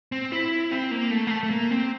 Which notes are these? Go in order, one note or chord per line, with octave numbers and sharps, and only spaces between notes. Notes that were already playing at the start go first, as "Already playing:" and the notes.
C4
E4
C4
A#3
A3
A#3
A3
A3
A#3
C4